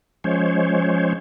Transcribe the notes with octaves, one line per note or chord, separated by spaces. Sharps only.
F3 G#3 C#4 C5 C#5